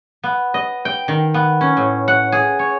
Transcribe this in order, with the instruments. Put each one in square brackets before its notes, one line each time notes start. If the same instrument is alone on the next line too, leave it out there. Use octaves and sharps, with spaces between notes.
[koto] B3
D#5
G5
D#3
B3
C#4
A2
F#5
G#4
C#5